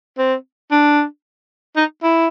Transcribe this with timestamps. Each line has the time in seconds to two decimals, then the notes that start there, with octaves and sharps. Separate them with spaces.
0.18 C4
0.72 D4
1.76 D#4
2.03 E4